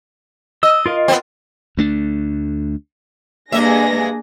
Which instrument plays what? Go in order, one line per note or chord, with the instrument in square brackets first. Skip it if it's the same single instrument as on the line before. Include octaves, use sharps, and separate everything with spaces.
[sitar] D#5 [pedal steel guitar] E6
[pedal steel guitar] F4 A#4 F5
[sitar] B3 C4
[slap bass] D2 A3 D4
[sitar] G2 D#5 E5 [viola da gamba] A#3 [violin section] D4 G#4 A#6